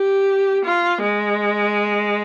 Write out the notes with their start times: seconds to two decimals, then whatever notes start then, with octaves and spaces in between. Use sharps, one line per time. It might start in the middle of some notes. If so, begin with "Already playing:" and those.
Already playing: G4
0.65 F4
1.02 G#3